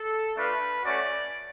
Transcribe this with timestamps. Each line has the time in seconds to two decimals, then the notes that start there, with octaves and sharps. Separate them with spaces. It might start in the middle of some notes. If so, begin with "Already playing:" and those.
Already playing: A4
0.36 A3 D4 F4 B4
0.83 A3 C#4 F#4 D5